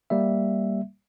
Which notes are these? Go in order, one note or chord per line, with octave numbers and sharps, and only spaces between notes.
G3 A#3 E5